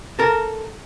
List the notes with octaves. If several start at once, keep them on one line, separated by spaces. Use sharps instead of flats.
A4 A#4